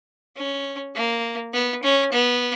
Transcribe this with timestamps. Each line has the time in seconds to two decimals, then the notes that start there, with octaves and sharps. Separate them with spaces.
0.36 C#4
0.95 A#3
1.53 B3
1.83 C#4
2.12 B3